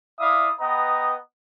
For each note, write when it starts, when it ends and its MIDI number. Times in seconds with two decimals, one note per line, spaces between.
0.20 0.49 64
0.20 0.49 74
0.20 0.49 76
0.20 0.49 77
0.20 0.49 87
0.60 1.16 59
0.60 1.16 71
0.60 1.16 75
0.60 1.16 79
0.60 1.16 82